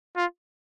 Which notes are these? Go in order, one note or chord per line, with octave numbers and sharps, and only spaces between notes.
F4